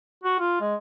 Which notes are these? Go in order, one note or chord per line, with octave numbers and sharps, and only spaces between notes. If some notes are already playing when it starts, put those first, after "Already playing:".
F#4
F4
G#3